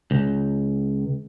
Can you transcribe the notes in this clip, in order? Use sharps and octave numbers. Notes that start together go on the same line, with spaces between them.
C#2